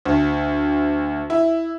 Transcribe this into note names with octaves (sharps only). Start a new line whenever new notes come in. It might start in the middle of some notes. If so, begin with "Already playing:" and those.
D2
E4